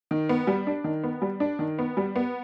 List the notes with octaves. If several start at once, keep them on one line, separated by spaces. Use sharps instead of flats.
D#3
B3
G3
D4
D#3
B3
G3
D4
D#3
B3
G3
B3